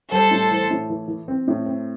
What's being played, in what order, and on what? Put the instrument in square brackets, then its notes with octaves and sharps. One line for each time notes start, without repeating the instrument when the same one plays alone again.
[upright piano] G3 [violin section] A4 C5
[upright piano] A2
E3
A2
E3
E3
C4
A2
C4